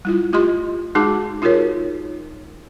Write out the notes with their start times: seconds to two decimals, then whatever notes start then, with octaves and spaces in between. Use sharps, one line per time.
0.05 G3 E4 F4
0.33 A3 F4 G4 D#5 C6
0.95 G#3 D#4 F#4 G#4 A5 D6
1.42 D#4 F4 F#4 G#4 A#4 C#5